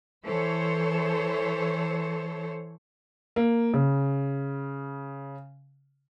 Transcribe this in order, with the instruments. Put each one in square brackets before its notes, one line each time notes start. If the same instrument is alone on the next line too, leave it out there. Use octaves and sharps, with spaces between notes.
[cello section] E3 A4 C5 C#5
[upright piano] A#3
C#3